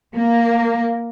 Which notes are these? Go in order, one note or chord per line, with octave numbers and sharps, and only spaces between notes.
A#3